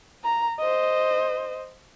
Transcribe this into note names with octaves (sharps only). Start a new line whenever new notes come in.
A#5
C5 D#5